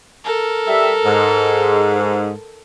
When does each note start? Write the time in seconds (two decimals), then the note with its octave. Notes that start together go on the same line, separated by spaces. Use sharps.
0.24 A4 A#4
0.67 G3 E5
1.05 G#2